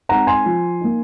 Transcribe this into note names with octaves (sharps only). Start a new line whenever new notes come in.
G#3 C4 D#4 F#5 A#5
G#5 C6
F3
A#3 D#4